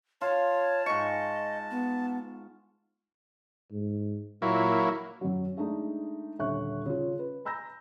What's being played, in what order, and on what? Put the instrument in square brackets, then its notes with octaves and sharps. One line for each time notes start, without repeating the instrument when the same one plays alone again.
[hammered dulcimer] F4 [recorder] C#5 [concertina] A5
[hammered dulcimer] G#2 C#6 [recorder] D#5
[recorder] B3
[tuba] G#2
[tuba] A#2 [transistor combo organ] F#3 A#3 E4
[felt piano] F#2 F#3
G#3 A3 D4 D#4
D#1 D3 C#4 E5 C#6 F#6
C#3 F4
B4
A#5 B5 E6 G6 A#6